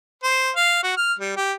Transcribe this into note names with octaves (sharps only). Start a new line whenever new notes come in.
C5
F5
F#4
F6
G3
G4